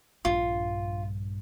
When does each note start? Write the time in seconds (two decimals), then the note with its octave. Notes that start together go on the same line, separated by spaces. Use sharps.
0.25 A#1 G2 F4